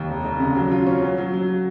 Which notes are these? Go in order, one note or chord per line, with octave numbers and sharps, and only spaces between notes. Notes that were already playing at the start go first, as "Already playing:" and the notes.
Already playing: D#2
F1
F1
C#3
F#3
F4
C#4
F#3
F#3
F#3